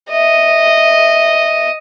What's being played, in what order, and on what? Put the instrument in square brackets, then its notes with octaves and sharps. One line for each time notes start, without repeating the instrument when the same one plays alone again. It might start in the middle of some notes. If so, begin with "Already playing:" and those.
[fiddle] D#5 [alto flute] E5